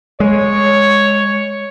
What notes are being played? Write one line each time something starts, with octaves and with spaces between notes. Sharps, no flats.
G#3 C#5